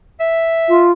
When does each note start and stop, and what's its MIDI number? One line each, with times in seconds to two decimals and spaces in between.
0.20 0.86 76
0.69 0.92 65